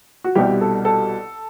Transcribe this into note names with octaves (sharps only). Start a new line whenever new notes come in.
F#4
C2 B2 G3 G4
A4
A4